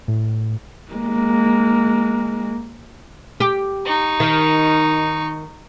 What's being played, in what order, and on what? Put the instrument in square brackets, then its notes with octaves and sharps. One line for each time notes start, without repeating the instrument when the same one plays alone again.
[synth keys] A2
[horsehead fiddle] G#3 A#3
[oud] G4
[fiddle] D#4 C#6
[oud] D#3